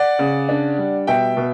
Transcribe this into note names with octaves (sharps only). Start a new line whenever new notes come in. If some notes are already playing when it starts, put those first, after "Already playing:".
Already playing: D5 F#5
C#3
D4
G3
B2 E5 G5
B2